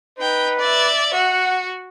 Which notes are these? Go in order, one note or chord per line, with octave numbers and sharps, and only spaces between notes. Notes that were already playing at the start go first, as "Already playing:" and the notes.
D#4 B4 G5
D5 E5
F#4 F#5